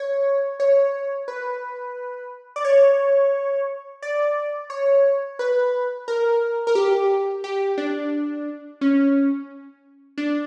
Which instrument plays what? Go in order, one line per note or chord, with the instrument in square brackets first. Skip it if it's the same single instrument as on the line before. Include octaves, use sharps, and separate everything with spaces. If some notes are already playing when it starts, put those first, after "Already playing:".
Already playing: [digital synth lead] C#5
C#5
B4
D5
C#5
D5
C#5
B4
A#4
A#4
G4
G4
D4
C#4
D4